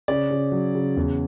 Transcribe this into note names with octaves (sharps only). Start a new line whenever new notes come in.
C#3 D5
C#3
F#3
C#3
E2